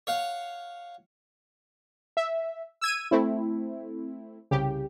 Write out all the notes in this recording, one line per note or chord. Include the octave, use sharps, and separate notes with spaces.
C#5 F5 F#5
E5
E6 G#6 D#7
A3 C4 E4
C2 C#3 G4